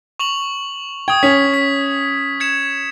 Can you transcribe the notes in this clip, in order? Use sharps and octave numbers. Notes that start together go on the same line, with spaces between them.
C#6 F7 F#7
G5 D#6 G#6
C#4 B6
B6
G#6 C#7 E7